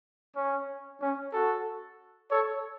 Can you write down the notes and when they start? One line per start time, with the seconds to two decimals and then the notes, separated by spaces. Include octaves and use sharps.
0.36 C#4
1.00 C#4
1.33 F#4 A4
2.30 A4 C#5